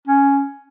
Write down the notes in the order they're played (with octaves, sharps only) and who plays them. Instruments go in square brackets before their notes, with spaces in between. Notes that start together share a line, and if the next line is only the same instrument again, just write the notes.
[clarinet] C#4